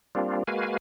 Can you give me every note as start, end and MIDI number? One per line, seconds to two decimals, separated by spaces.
0.15 0.43 55
0.15 0.43 58
0.15 0.43 60
0.15 0.43 62
0.15 0.43 65
0.47 0.77 56
0.47 0.77 58
0.47 0.77 66
0.47 0.77 71
0.47 0.77 77
0.47 0.77 80